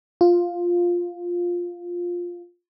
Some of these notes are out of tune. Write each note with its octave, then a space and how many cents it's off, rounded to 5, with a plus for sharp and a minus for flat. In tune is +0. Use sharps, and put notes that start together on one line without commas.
F4 +5